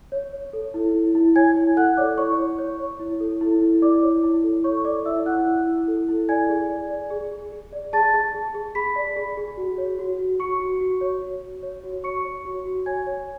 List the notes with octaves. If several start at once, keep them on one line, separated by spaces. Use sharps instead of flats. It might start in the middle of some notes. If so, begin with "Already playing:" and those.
C#5
C#5
A4
E4
E4
E4
C#5 G#5 G#6
E4
A4 F#5 F#6
C#5 D5 D6
E4 C#5 C#6
C#5
C#5
C#5
E4
A4
E4
E4
E4 D5 D6
C#5
E4
A4
A4 C#5 C#6
C#5 D5 D6
E4 E5 E6
E4 F#5 F#6
E4
E4
A4
E4
D5 G#5 G#6
G#4
D5
D5
G#4
G#4
G#4
D5
G#4 A5 A6
G#4
G#4
G#4
G#4 B5 B6
D5
G#4
G#4
F#4
C#5
F#4
F#4
F#4 C#6 C#7
F#4
F#4
C#5
F#4
C#5
C#5
F#4
C#5 C#6 C#7
C#5
F#4
F#4
C#5 G#5 G#6
C#5